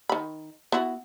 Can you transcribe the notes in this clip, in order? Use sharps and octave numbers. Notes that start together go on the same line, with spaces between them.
D#3 B5
B3 E4 F#4